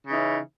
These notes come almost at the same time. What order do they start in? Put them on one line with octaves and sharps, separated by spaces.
C#3 D#4 E3 C#4